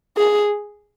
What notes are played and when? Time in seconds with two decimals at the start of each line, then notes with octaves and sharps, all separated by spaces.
0.17 G#4